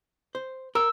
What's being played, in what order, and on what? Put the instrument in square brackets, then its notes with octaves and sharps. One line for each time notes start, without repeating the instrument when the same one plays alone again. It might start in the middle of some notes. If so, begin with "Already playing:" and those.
[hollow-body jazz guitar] C5
[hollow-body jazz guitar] A#4 [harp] E6